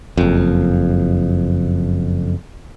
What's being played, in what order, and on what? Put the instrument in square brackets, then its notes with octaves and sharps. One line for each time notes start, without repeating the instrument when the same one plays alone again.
[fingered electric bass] F#1 F2